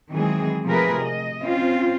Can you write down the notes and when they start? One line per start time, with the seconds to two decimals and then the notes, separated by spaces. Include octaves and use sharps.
0.11 D#3 E3 F#3 G#3 C4 G#4
0.65 C3 F3 A3 G#4 A#4 B4
1.02 D#5
1.42 C4 C#4 F4 C5